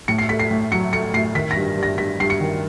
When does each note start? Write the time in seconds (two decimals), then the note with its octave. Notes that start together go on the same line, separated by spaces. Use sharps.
0.08 A2 C#7
0.18 C7
0.29 A3 B6
0.40 C7
0.51 A2
0.72 F#3 C#7
0.92 A3 C#7
1.14 A2 C7
1.35 D#3 B6
1.51 A#6
1.56 G2
1.77 G2
1.83 A#6
1.98 G2 B6
2.20 G2 C7
2.30 C#7
2.40 D#3